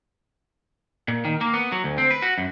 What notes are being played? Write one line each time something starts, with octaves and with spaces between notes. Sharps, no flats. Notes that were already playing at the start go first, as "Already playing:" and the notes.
A#2
D#3
A#3
B3
F#3
D2
C4
B4
F#4
F#2